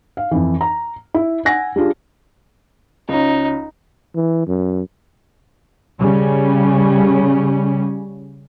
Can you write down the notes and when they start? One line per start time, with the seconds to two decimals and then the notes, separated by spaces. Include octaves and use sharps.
0.17 F5
0.31 F2 E3
0.61 A#5
1.14 E4
1.45 F#5 G#5 A#6
1.76 G3 D4 F4 G#4
3.09 C#2 C#4 D#4
4.15 E3
4.47 F#2
5.99 C#3 G3 C#4